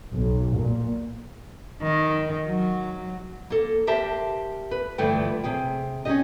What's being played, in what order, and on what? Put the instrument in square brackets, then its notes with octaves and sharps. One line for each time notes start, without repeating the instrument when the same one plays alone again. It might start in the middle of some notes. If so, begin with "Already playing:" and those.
[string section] B1
A#2
[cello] D#3
F#3
[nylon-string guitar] A#3 A4
G4 A#4 C5 E5 A5
B4
G2 D3 E3 F3 A3 G5
C3 G#4 G5
C#4 D#4 F4 G4 D#5